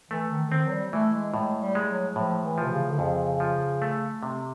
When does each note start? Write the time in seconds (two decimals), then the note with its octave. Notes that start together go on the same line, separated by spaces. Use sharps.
0.11 E3 A3
0.31 D#3
0.51 D#3 C4
0.67 F#3
0.72 G3
0.92 E3 A3
1.13 G#3
1.34 A2 G#3
1.61 G3
1.75 G#3
1.89 F#3
2.16 A2 F3
2.44 E3
2.58 F3
2.63 C3
2.72 C#3
2.90 D3
2.99 F2 C#3
3.40 F3
3.82 A3
4.23 C3